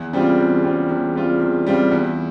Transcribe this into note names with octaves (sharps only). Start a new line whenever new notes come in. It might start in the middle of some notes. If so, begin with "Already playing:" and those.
Already playing: E2
C#3 G3 C4 F4
E2
C#3 G3 C4 F4
E2
C#3 G3 C4 F4
E2
C#3 G3 C4 F4
E2